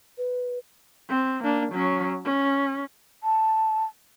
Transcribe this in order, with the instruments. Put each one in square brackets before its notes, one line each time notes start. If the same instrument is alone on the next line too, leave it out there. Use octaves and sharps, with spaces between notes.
[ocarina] B4
[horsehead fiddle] C4
A#3 D4
F#3 C#4
C#4
[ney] A5